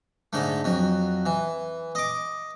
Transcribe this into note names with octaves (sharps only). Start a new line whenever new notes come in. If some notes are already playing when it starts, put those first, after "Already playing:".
G#2 D3 A3
F2 F#3
E3
D#5 D6